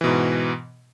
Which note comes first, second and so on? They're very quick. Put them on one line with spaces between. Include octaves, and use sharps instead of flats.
E3 B2 G#2